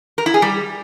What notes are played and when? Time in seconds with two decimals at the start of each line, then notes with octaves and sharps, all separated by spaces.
0.18 A#4
0.26 E4
0.34 G#4
0.42 G3